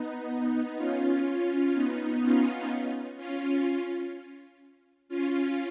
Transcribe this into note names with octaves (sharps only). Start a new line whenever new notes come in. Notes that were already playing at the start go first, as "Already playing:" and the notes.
Already playing: B3 D#4
C#4 F4
B3 D#4
C#4 F4
C#4 F4
C#4 F4